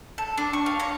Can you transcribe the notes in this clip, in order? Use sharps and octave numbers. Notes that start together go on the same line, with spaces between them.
A4
D4
C#6
F5
C#5